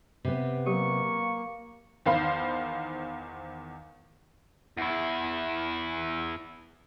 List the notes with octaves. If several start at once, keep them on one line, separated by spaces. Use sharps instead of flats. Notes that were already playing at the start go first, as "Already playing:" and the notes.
C3 B3
F#3 A#3 G4 C#6
E2 D#3 C5 F5 B5
E2 E4